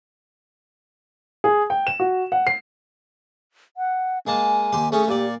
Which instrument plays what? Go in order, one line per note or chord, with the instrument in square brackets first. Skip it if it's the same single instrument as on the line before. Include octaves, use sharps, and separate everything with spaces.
[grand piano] G#4
G5
E7
F#4
F#5
C7
[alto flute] F#5
[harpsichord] G#3 A#3 A5 [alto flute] G#5
[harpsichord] D#2 G4 C6
[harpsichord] A3 C#4 [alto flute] G#4
[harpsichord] A#2 D5 [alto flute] G4